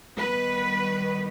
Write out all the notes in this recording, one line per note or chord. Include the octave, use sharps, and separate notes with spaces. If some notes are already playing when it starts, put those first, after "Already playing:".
D#3 G3 B3 B4